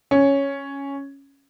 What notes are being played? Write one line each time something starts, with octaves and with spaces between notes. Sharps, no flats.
C#4